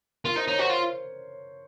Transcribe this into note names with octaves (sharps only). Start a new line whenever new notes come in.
F4 A#4
D#4 C5
D#4 C#5
F#4 C5
F4